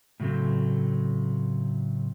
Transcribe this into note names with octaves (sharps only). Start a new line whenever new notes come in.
A2 C#3 F#3 A3 C4